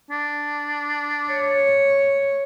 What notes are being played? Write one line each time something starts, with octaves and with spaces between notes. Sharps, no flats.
D4
C#5